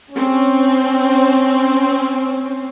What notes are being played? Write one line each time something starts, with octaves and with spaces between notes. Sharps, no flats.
C4 C#4